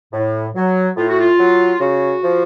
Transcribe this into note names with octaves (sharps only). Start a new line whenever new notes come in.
A2
F#3
A2 F4
F#4
F4
F#3
C#3 F#4
F3